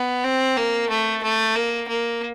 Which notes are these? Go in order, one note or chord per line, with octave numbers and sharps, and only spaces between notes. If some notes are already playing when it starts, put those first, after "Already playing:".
Already playing: B3
C4
A#3
A3
A3
A#3
A#3